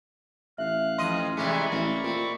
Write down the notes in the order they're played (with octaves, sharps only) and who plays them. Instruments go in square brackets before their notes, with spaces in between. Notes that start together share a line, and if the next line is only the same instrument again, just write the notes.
[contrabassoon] A1 [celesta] E5 [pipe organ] F5 F#6
[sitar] F2 B2 D#5 [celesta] C6 D#7
[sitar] C3 E3 G#3 [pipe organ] D5 B5 C#6
[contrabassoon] A1 [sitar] A#3
[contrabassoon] A#2 [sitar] C4